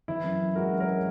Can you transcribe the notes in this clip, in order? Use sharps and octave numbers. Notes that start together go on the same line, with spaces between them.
E3 E4
F#2
F#2
G#3 F#4 A#4
F#2
A#4 C#5
G#3